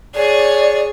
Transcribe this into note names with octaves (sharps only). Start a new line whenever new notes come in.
G#4 C#5 D5